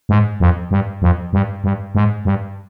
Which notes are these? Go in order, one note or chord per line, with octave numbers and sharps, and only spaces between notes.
G#2
F2
G2
F2
G2
G2
G#2
G2